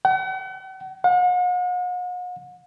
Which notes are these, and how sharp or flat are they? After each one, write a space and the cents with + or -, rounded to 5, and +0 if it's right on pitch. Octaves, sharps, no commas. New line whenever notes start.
F#5 +40
F#5 -45